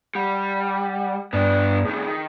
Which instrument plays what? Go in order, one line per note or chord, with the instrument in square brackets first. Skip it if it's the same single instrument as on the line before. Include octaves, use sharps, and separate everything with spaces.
[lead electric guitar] G3 [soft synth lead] F#5
[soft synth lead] G2 [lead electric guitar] B3 D4
[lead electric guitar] A2 D#3 [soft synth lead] G#4
[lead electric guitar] D#3